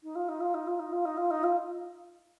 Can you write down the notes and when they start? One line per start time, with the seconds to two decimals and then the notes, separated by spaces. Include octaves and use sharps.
0.03 D#4
0.15 F4
0.28 D#4
0.40 F4
0.54 D#4
0.67 F4
0.79 D#4
0.92 F4
1.05 D#4
1.17 F4
1.31 D#4
1.43 F4